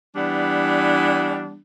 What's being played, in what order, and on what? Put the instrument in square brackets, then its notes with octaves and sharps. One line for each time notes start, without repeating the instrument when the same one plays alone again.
[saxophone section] E3 G3 B3 D4